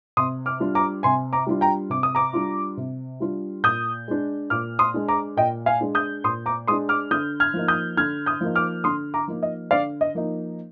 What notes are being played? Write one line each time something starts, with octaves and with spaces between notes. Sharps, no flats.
C3 C6 D#6
D6 F6
G3 D4 F4
A#5 D6
C3 G#5 C6
A#5 D6
G3 D4 F4
G5 A#5
C3 D6
D#6
A#5 D6
G3 D4 F4
C3
G3 D4 F4
A#2 D#6 G6
G#3 D4
A#2 D6 F6
C6 D#6
G#3 D4
A#5 D6
A#2 D#5 G5
F5 G#5
G#3 D4
D#6 G6
A#2 C6 D#6
A#5 D6
G#3 D4 C6 D#6
D6 F6
D3 D#6 G6
F6 G#6
F3 A#3 D#4
D#6 G6
D3 F6 G#6
D#6 G6
F3 A#3 D#4
D6 F6
D3 C6 D#6
A#5 D6
F3 A#3 D#4
D#5
D3 D5 F5
D#5
F3 A#3 D#4